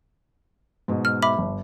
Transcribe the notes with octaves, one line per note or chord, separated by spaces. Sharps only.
G#2 B2
F6
E5 B5 D6
G1